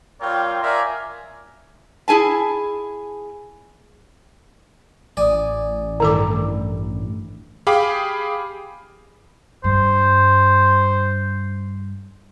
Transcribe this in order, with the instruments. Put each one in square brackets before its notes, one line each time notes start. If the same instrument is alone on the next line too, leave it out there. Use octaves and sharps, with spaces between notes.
[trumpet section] G3 C4 F4 A#4 C#5 G5
F4 A#4 D5 E5 F5 G#5
[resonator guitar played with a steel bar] E4 G#4 G#5 A5
[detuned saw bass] A1 [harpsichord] D5 [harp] G#5 D#6
[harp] G2 E4 [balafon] D#3 A4 D6
[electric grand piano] G4 G#4 F5 G5 B5 D6
[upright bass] G2 [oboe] C5